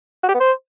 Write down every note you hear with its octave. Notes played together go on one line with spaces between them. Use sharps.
F#4
G4
B3
C5